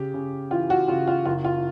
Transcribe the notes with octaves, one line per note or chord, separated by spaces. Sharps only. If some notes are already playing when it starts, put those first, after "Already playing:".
Already playing: C#3 G4
C#3
E3 F4
F#4
C#3 F4
F4
F#1 F4
F4